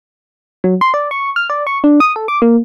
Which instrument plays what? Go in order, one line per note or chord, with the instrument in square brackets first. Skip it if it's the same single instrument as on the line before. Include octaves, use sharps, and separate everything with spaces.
[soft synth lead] F#3
C6
D5
C#6
F6
D5
C#6
D4
D#6
A4
D6
A#3